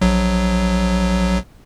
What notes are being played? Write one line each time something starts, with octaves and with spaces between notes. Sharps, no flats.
A#1 F#3